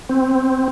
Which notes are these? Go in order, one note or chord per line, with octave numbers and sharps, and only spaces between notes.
C4